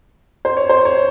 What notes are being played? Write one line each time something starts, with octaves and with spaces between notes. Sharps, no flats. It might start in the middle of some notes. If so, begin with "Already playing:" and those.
C5
C#5
C5
C#5